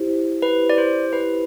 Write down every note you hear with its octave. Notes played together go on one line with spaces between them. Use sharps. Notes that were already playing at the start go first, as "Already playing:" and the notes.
Already playing: E4 G4 C5
B4
D5
C5
B4